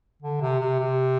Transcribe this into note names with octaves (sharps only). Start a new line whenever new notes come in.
D3
C3
C3
C3